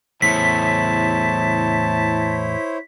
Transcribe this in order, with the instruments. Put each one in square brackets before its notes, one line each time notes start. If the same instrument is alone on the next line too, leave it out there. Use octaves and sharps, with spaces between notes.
[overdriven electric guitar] E2 A2 [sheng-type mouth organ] E4 C5 C#5 [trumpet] A5 [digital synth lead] B6